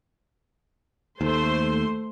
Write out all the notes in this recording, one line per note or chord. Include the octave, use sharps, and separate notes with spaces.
D#2 A3 C5 C6